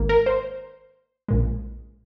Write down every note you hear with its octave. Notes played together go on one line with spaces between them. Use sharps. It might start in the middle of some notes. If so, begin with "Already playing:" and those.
Already playing: G#1 G#2 D#3 A#3
A#4
C5
A#1 A#2 G#3